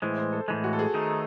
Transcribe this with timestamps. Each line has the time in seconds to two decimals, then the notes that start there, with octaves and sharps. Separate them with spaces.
0.02 A2 E3 G#3 C5
0.18 C5
0.33 A4
0.48 A2 E3 G#3
0.64 F#4
0.73 A4
0.79 G#4
0.94 D#3 A3 D#4